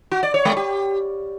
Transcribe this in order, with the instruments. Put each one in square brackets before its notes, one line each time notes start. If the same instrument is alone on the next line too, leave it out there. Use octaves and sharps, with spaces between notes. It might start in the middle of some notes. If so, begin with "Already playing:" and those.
[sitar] F#4
D5
C#5
G#3
G4